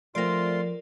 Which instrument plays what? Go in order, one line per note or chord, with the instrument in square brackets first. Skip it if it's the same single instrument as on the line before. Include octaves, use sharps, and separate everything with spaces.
[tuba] F3 [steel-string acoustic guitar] A3 C4 [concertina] F4 C6 [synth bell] A#4 D5